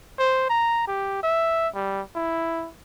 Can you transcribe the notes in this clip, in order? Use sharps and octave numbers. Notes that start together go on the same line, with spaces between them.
C5
A#5
G4
E5
G3
E4